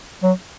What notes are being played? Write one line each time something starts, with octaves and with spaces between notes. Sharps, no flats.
F#3